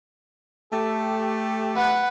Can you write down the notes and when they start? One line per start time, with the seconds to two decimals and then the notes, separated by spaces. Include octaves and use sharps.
0.72 A3 G4 A4
1.76 B4 F#5